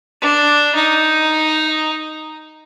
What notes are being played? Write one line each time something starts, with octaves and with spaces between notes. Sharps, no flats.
D4
D#4